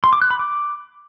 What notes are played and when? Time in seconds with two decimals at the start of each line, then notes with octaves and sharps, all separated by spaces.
0.04 C6
0.13 D6
0.22 F#6
0.30 B5
0.39 D6